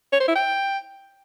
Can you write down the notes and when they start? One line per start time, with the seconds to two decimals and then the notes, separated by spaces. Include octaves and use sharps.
0.13 C#5
0.20 C5
0.28 E4
0.36 G5